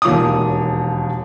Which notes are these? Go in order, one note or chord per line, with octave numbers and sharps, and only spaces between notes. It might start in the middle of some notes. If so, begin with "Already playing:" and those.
E1 D#2 F3 C#5 D6 D#6